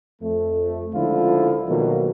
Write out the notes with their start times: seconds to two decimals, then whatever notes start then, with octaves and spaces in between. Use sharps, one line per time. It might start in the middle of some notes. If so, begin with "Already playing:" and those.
0.21 F2 A3
0.93 C#2 D3 F3 E4 F4
1.67 B2 D#3 F3 F#3 A3 A#3